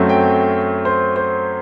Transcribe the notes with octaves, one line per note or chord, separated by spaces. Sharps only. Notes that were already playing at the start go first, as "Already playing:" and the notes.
Already playing: F#2 F#3 A3 C4
G5
C5
C5